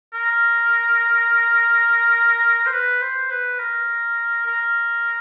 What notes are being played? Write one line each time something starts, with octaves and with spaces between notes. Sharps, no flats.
A#4
C5
B4
C5
B4
A#4
A#4